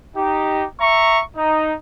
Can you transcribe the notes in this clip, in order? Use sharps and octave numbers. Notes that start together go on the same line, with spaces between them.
D#4 G4
E5 A#5 C#6
D#4